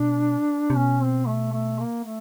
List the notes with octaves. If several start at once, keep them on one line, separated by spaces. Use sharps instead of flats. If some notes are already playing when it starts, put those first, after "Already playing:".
Already playing: B2 D4
C3
B2 C#4
C4
A3
A3
A#3
A3